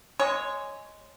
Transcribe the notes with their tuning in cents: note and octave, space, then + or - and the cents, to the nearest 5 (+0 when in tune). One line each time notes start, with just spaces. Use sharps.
G#3 +0 C#5 +0